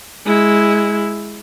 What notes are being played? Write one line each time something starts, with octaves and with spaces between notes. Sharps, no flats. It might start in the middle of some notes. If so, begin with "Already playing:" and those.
G#3 E4